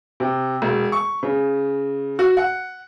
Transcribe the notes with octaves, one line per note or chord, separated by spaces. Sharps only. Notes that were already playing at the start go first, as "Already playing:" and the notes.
C3
E1
C#6
C#3
F#4
F#5